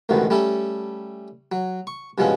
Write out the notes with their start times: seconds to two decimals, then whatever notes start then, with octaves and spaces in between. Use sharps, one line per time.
0.09 A1 D2 G#2 B2 D#3
0.30 G3 A3 C#4 A4
1.52 F#3
1.87 C#6
2.18 G2 B2 F3 G#3 C#4